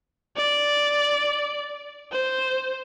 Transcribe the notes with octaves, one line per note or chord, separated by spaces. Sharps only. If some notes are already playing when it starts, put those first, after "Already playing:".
D5
C5